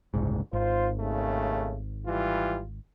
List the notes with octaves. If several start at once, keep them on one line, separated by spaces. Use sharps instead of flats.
F#1 C2 G#2
G#1 F4 C5
D#2 C#3 A3
E3 G3 F4